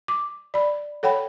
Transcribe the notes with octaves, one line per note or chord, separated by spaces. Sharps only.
D6
D5 B5
A4 C#5 F#5 G5 B5